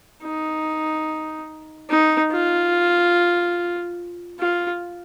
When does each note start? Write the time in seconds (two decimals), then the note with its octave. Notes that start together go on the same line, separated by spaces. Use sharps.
0.24 D#4
1.90 D#4
2.32 F4
4.40 F4